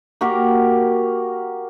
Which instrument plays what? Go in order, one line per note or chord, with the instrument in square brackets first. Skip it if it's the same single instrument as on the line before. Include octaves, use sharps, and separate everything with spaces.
[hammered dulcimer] A#3 F#4 G4 A#4